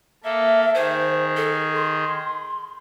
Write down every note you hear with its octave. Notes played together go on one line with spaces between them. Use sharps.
A#3 A4 E5
D#3 G#4 C5
A4
C6